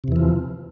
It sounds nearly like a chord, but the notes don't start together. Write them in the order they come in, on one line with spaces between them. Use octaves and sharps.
C3 E2 E3 F3